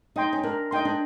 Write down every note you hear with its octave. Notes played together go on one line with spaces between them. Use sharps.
D#4 D#5 G5 C6
C#4
D4 A#4
D#4 D#5 G5 C6
D4